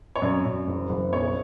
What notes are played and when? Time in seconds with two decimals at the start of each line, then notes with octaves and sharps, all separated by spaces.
0.16 C#5
0.22 F#2 D5
0.45 F#2
0.67 F#1
0.89 F#1
1.12 B1 C#5